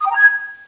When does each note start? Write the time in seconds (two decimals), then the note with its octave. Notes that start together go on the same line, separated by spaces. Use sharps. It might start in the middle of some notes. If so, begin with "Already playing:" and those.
0.01 D#6
0.06 G5
0.11 A#5
0.16 G#6